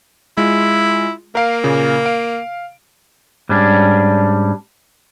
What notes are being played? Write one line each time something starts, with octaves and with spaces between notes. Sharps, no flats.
G#3 E4 F4
A#3 A#4 F5 D7
A#2 C#3
F5 D7
G#2 G3 C#4 D4